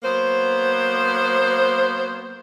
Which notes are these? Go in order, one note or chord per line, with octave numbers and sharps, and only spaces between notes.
F#3 A#3 B3 C5